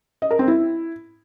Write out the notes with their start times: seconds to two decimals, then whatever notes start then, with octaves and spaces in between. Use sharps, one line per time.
0.22 D#5
0.31 A#4
0.39 C4
0.48 E4